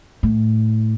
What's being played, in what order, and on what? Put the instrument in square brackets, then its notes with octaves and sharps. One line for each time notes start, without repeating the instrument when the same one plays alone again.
[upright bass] A2